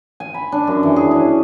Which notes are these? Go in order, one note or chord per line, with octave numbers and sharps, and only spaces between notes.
G#5
B5
D4
F#2
E3
G#4
C#4